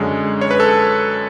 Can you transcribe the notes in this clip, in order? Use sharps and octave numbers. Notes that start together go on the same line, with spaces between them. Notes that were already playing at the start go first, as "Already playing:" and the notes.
Already playing: F#2 D3 G#3 C#4
C#5
B4
A4